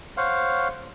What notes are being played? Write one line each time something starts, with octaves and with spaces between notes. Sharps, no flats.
C5 C#5 F5 F#5